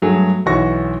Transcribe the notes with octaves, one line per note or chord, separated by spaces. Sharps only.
G2 F#3 A3 G#4
B1 E3 F#4 C#5 C#6 A#6